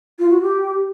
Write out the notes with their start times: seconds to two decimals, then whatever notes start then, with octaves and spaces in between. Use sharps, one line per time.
0.19 F4
0.30 F#4
0.42 G4